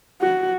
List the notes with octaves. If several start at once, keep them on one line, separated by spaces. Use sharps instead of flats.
F#4